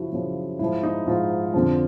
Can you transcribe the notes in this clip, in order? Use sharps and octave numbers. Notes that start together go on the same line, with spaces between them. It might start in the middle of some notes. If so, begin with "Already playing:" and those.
Already playing: F#2 C#3 F3 E4 F#4
F#2 C#3 F3
G#2 F3 E4
D#4
G#2 F3 F4
F2 D3 F3